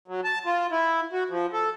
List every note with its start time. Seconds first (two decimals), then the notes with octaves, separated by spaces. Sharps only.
0.08 F#3
0.24 A5
0.46 F4
0.72 E4
1.13 F#4
1.30 F3
1.53 A4